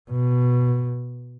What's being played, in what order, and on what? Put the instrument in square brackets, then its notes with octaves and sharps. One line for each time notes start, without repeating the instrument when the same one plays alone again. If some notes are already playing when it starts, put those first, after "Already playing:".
[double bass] B2